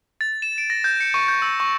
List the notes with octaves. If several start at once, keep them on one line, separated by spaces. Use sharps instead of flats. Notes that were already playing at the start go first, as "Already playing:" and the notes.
A6
E7
D7
A#6
G6
C#7
C#6
G6
E6
C#6